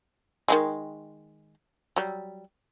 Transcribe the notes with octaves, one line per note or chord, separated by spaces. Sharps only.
D#3 F#3 G#3
F#3 G3